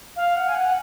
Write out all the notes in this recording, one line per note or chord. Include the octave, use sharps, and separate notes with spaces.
F5
F#5
G#5
F#5